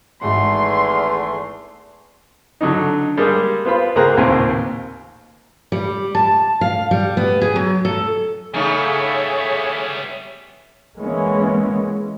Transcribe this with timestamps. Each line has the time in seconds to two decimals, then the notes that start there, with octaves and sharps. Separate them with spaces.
0.21 G#1 E2 G#2 E3 A3 F#5 C6
2.61 D3 F#3 D4 D#4
3.17 G3 G#3 A#3
3.65 B3 F4 C5 B5
3.96 C#2 A#3 G#4 C5 A#5 F#6
4.17 A1 D#2 A#2 C4 C5 G#5
5.72 G3
6.15 A5
6.61 F5
6.91 G3
7.17 B3
7.42 G#4
7.56 F#3
7.85 A4
8.54 C#3 G3 A3 B3 D#4 G#4 C#5 E5
10.97 E3 G#3 A#3 B3 C#4